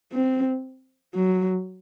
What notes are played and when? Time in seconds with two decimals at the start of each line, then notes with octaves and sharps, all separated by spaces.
0.13 C4
1.15 F#3